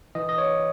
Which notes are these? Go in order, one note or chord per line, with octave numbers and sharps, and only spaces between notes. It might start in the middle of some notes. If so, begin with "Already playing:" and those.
E3 D#5
D#5
C#5